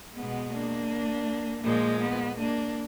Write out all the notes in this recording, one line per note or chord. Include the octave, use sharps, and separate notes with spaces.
B2 G#3 B3
A#3 D4
A#2 F3 G#3 A#3
B3
A#3 D4